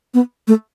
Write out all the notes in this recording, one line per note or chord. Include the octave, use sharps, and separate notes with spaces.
B3
A3